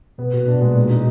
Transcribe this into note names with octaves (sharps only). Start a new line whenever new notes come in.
B2 B3
A#2 F#4
B2 D4
A#2 G#3
A#2 F#3
D#4